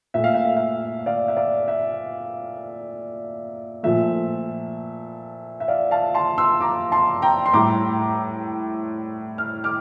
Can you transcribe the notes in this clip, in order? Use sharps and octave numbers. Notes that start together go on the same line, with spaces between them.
A#2 A3 E5
F5
E5
F5
E5
D5 F5
E5
D5 F5
E5
A#2 F3 A3 E5
E5
D5 F5
F5 A5
A5 C6
C6 E6
A#5 D6
A5 C6
G5 A#5
C6
A2 G3 A#5 D6
F6
D6 F6